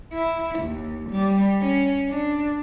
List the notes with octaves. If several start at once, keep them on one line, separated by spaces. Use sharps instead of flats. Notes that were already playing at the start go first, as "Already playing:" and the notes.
E4
D#2
G3
C#4
D4